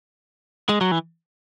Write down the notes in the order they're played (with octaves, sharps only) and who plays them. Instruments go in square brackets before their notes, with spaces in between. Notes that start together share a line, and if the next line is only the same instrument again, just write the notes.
[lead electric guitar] G#3
F#3
E3